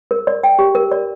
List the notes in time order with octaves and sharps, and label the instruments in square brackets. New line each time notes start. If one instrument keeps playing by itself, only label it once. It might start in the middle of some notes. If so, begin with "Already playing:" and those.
[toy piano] A#4
D5
G5
G4
A#4
D5